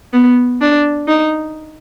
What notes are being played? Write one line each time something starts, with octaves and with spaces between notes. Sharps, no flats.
B3
D4
D#4